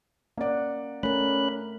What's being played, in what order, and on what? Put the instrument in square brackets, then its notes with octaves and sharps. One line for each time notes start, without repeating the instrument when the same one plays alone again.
[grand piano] A#3 D5 [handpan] C#4 F#5
[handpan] A3 A#4 [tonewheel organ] C#4 B5 F#6